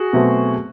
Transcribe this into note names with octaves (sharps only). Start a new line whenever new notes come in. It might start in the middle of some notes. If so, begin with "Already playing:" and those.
Already playing: F#4 G#4
B2 F#3 A3 C4